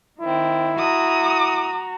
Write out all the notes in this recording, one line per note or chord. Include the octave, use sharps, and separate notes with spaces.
D#3 C4 E4
F#4 A#5 D#6